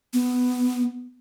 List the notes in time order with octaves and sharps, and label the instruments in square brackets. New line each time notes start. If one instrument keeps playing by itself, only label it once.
[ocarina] B3